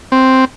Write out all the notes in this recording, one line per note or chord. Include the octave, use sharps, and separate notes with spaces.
C4